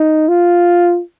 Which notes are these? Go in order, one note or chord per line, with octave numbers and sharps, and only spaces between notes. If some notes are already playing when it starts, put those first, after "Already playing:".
Already playing: D#4
F4